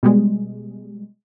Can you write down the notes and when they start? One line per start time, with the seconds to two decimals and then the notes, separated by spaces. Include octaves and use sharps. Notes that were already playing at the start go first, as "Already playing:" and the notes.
0.03 B2 G3 G#3